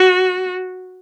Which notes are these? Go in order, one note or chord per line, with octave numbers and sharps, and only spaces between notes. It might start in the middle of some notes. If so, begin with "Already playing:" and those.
Already playing: F#4